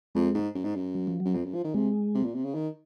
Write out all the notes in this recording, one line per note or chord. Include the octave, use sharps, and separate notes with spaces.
F2 G#3
G#2
F#2
G#2
F#2
F#3
F3
F#3
F#2
F2
F#2
F3
D#3
C3 G#3
C3
A#2
C3
C#3
D#3